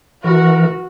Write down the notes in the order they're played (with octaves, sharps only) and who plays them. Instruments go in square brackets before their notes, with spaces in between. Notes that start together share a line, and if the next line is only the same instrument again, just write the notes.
[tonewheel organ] E3 A#4 [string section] F#4